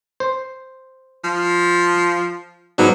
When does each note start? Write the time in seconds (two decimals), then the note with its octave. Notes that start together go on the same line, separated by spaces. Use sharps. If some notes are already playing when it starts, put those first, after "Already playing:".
0.20 C5
1.24 F3
2.78 G#2 F#3 B3 D4